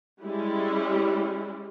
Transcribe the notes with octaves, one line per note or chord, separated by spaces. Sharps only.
G3 G#3 C#4 E4